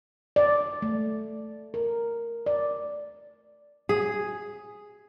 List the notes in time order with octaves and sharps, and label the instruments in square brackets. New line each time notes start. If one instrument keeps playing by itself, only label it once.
[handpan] D5
A3
A#4
D5
[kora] G#4